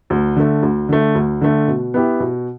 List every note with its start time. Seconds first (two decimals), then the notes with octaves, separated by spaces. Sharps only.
0.10 D2
0.36 D3 A3
0.62 D2
0.89 D3 A3
1.15 D2
1.41 D3 A3
1.68 B2
1.94 B3 E4 G4
2.20 B2